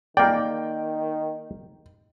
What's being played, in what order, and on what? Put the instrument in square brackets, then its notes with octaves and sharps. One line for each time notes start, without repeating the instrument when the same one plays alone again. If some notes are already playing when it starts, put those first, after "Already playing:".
[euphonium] D#3 [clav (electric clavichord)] A#3 D5 [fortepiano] G5